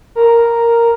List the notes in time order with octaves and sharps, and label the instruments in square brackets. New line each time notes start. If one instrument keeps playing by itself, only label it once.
[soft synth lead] A#4